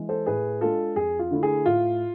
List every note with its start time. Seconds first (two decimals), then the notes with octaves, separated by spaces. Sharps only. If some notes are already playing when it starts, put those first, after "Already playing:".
Already playing: E3 G#3
0.09 A4 C5
0.26 A2 G#4 B4
0.61 G#3 D4 F4 A4
0.96 F2 G#4
1.19 F4
1.31 D3 A3 E4
1.43 G#4
1.66 A2 F4